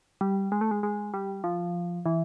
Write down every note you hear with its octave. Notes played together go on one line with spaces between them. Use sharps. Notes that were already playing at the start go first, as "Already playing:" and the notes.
G3
G#3
A3
G#3
G#3
G3
F3
E3